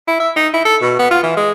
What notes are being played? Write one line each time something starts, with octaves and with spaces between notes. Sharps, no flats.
E4
E5
D#4
E4
A4
B2
B3
F4
E3
G#3